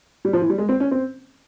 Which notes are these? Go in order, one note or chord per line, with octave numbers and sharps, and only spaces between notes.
G3
F3
E3
G3
G#3
C4
C#4
C4